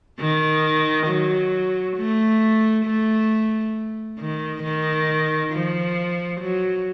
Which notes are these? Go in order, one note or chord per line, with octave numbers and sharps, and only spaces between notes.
D#3
F#3
A3
A3
D#3
D#3
F3
F#3